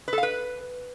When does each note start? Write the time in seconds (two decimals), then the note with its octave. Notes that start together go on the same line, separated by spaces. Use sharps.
0.08 B4
0.13 A4
0.18 F5
0.23 B4